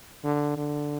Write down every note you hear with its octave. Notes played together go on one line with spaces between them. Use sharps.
D3
D3